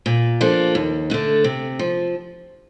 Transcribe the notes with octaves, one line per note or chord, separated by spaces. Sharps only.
A#2
F3 A#3 D4 A4
D#2
D3 A3 D4
C3
F3